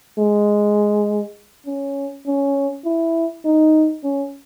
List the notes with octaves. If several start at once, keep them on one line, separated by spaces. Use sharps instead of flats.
G#3
C#4
C#4
E4
D#4
C#4